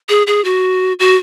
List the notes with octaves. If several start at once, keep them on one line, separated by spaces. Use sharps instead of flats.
G#4
G#4
F#4
F#4